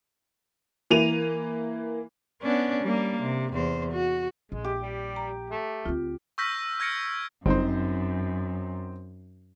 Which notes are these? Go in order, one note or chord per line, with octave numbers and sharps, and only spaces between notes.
E3 A#3 D#7 F7
B3 C#4 D4
G3 A#3
C3
E2 C5
F#4
A#1 G#3
G4
G3
A#5
A3
D2 C4 F4
C#6 E6 F6 G6 A#6 B6
F6 G#6 A#6 C#7 D7
G1 F#2 C4 D#4 C5